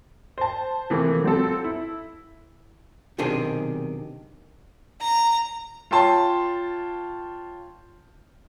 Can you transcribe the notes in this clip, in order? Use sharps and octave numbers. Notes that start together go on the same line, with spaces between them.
C5 A5
C3 E3 F3 A3 A#3
F#3 C4 F4 A4
E4
B1 C3 D#3 D4 G#4 C6
A#5
F4 C#5 G5 A5 C6